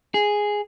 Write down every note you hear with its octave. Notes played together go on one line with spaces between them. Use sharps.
G#4